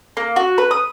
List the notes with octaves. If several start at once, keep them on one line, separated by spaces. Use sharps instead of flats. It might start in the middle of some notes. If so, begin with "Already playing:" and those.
A#3
F#4
B4
D#6